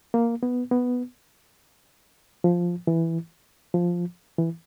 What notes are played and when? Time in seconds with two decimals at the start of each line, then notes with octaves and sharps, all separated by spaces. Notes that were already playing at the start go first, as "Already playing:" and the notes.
0.14 A#3
0.43 B3
0.72 B3
2.44 F3
2.87 E3
3.74 F3
4.39 E3